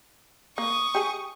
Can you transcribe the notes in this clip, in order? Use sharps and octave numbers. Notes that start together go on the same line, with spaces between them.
A#3 C#6 D#6
G4 G#4